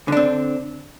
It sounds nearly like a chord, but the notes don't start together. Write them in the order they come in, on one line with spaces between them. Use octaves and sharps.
D3 D4 C4